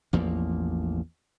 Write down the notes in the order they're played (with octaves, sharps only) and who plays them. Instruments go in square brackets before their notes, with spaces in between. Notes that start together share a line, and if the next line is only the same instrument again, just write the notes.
[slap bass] A1 E2 F3 A#3